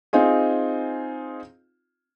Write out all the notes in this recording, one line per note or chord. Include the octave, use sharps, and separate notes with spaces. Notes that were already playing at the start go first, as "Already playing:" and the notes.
C4 D#4 F4 G#4